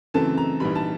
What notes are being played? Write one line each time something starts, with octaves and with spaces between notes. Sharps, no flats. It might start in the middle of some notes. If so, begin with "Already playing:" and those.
F#2 C#3 E3 A3 C4 A5
A#5
A#1 G#2 E3 G3 B5
A5